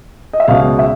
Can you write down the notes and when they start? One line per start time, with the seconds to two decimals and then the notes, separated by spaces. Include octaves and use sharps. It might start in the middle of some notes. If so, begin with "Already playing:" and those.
0.33 D#5
0.40 E5
0.48 C#2 B2 F#3 F5
0.79 E5